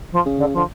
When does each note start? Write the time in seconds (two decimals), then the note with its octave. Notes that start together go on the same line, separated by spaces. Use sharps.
0.12 F3
0.26 C#3
0.38 D3
0.53 D3 F3